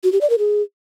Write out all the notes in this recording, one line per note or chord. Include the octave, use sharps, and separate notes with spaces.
F#4
G4
D5
A#4
G#4